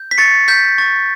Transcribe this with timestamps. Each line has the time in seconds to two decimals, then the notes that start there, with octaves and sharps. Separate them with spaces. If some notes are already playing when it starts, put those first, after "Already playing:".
Already playing: G6
0.11 B6
0.18 C#6 A6 C#7
0.48 G6 B6
0.78 C#6 A6